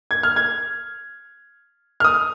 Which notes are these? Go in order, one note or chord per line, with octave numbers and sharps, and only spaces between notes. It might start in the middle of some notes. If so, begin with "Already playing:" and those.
G#6
F6
G#6
F6
D#6